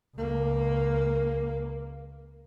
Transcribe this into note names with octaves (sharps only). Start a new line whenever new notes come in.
C#2 A#3